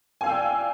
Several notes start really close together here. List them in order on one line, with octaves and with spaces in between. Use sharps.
G#5 F5 E6 G5 D5